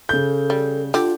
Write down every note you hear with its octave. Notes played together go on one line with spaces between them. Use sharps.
C#3 A4 G6
G3
D3 F4 G4